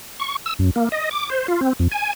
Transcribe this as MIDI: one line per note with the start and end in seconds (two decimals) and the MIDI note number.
0.20 0.36 85
0.46 0.54 88
0.59 0.71 42
0.76 0.89 58
0.92 1.09 75
1.11 1.29 86
1.30 1.47 72
1.48 1.61 65
1.61 1.73 60
1.80 1.88 41
1.92 2.13 80